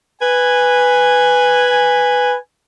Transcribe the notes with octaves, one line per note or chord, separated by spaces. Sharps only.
B4 G#5